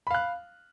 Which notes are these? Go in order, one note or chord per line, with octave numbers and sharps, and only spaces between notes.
F5 B5 F#6